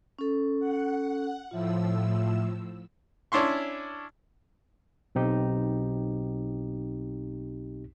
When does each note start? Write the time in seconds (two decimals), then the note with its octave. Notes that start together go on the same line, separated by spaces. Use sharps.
0.19 C#4 A4
0.60 F#5
1.51 A2 F3 F4 E5 E6
3.32 C#4 D4 E4 C6 C#6
5.15 B1 C4 D#4 G4